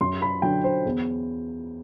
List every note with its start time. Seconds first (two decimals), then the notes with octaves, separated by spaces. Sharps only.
0.01 F#2 C6
0.22 B5
0.42 D3 F#3 G5
0.64 C5
0.86 E2